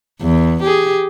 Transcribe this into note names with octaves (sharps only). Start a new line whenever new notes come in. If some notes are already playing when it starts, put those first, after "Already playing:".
E2
G4 G#4